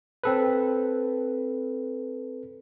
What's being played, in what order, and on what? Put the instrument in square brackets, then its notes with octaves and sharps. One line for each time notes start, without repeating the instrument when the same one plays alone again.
[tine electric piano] C4 A4 B4